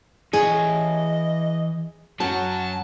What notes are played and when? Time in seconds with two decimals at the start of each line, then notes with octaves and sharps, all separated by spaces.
0.33 E3 G#4 C#5 D#5
2.20 F#2 F#3 F#4 A5